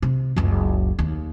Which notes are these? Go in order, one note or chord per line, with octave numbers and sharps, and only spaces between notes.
C3
F#1 C#2
D#2